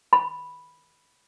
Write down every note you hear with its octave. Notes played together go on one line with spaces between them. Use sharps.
B5